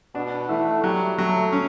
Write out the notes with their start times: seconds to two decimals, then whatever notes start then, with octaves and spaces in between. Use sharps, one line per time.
0.15 B2 D4
0.49 E3 A3
0.83 F#3 G3
1.18 F#3 A3
1.52 C#4